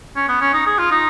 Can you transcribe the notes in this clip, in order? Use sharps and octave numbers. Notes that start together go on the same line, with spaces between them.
C#4
B3
C#4
D#4
G#4
F4
D#4